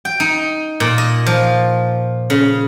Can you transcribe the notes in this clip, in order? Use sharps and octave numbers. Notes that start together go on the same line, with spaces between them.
G5
D#4
A#2
D#5
F3
C#3